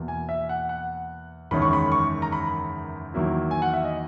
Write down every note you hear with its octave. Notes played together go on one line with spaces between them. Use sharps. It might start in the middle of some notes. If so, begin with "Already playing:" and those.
Already playing: E2 B2 A#3
G#5
E5
F#5
F#5
F#1 E2 D#3 G#3 C#4 B5
C#6
B5
C#6
A#5
B5
E2 D#3 F#3 A#3 E4
G#5
F#5
E5
D#5